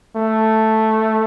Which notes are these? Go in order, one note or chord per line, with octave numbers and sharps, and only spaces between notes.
A3